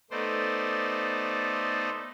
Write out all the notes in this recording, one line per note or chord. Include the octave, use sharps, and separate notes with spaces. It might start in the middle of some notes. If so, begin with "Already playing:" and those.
A3 B3 D#4 C5 D5